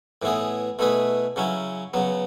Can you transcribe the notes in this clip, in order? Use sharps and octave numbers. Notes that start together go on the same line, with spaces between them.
A2 E3 B3 E4 G#4
B2 A3 E4 G#4 B4
C#3 F#3 C#4 E4
C#3 F#3 B3